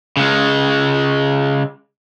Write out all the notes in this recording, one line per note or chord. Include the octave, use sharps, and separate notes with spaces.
C#3 G#3